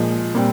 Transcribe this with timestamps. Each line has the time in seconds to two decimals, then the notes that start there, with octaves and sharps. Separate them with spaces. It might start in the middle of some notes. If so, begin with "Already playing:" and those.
Already playing: A#2 F3 G#3
0.35 A#2 G3 C4